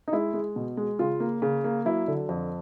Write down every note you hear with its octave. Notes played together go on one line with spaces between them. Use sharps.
D#4
G#3 E4
G#3
B2
G#3
C#3 F4
A#3
C#3
A#3
F#3 E4
D3
F2